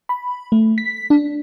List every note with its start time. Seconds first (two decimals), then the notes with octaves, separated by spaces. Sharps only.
0.09 B5
0.52 A3
0.78 B6
1.10 D4